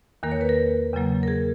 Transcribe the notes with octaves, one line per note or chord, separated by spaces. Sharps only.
E2 D#3 A#3 A#4
C#5
B4
A#4
E2 C#3 F#3 A#3
A#4
G#4